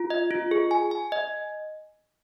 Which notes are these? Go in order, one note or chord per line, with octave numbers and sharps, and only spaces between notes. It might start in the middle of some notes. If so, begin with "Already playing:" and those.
Already playing: F4
D#5
F4
G#4
G#5
G#5
D#5